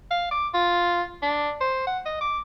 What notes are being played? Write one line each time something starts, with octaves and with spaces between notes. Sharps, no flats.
F5
D6
F4
D4
C5
F#5
D#5
D6